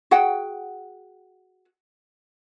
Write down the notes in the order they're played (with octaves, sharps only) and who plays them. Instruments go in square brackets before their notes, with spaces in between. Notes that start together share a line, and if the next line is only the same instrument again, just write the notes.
[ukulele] F#4 G#4 F#5 G5